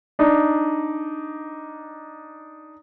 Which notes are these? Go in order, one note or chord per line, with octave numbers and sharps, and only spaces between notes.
D4 D#4